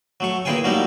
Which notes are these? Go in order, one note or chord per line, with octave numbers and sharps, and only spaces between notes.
F#3 A3 C#6
A#2 E3 E4 G#4 G5 G#5
F#3 G3 A3 A#3 D#4 E4